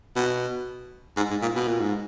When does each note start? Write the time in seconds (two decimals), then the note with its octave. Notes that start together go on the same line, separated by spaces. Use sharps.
0.16 B2
1.17 G#2
1.30 G#2
1.42 A#2
1.55 B2
1.67 A#2
1.81 G#2